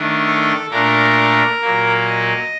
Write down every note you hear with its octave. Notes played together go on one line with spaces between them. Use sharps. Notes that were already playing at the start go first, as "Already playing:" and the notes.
Already playing: D#3 A3 D4
A4
A#2 A3 D4 A#4
A#2 F#3 A#3
D#5